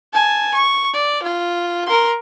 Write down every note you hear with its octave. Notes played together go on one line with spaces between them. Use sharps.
G#5 A5
C#6
D5
F4
A#4 C6